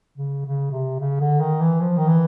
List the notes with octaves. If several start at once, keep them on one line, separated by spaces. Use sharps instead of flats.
C#3
C#3
C3
C#3
D3
D#3
E3
F3
D#3
E3